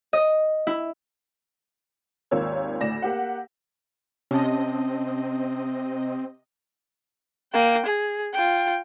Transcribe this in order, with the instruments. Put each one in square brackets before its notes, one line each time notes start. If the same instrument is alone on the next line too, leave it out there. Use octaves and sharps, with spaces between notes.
[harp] D#5
E4
[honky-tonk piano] G#1 D#2 F4 A#4 C#5 E6
D2 A2 D5 A#6 E7
A#3 G4 F#5
[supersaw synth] C3 D#5 [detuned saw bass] C4 [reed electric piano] C#4 A5
[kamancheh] A#3 G5
G#4
F4 G5